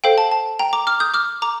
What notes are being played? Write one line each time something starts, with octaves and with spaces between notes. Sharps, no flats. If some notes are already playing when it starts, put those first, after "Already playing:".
A4 C5 F5 G5
A5
A5
G5 A#5
A#5 D6
D6 F6
D#6 G6
D6 F6
A#5 D6